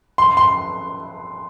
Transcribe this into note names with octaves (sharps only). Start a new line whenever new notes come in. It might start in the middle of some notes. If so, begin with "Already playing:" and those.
C6
C6